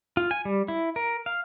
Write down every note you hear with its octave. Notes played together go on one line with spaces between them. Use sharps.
F4
G#5
G3
E4
A#4
F5